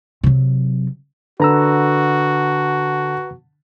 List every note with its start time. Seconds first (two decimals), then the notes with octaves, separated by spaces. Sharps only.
0.23 C3 F#3
1.40 D3 F#4 B4 A#5 E6